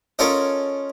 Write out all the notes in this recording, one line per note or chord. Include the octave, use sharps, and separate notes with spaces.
C#4 F4 A4 A#4 D#5